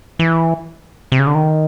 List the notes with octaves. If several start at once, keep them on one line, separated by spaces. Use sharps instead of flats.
E3
C3
C#3
D3
D#3